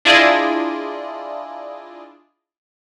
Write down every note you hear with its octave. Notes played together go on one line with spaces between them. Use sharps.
D4 E4 F4 G#4 D5 D#5